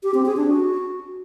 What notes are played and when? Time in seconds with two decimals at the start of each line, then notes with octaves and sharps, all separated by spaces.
0.03 G4
0.14 C4
0.26 G#4
0.37 D4
0.48 F#4